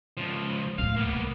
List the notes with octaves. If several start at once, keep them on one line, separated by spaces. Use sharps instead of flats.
C#2 F3
D2 A2 F5
A#3 B3
C2